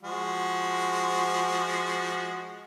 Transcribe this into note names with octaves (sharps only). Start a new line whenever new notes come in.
F3 G#3 F#4